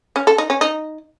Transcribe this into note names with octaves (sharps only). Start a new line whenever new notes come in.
C#4
A4
D#4
C#4
D#4